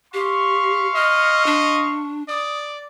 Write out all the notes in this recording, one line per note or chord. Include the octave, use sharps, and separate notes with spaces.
G4 F5 C6 C#6
D#5 F6
D4
D5 D#6